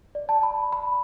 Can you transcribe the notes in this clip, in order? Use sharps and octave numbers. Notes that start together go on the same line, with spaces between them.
D5
A5
B5
B5